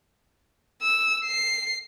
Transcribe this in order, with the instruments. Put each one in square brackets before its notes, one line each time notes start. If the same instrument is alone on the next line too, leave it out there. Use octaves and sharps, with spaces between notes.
[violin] E6
C7